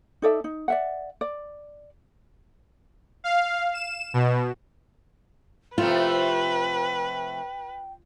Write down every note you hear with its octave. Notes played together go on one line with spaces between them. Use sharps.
D#4 A4 D5 E5
D#4
D5 E5 F#5
D5
F5
E7
B2
C3 F3 A3 F4 B4 G5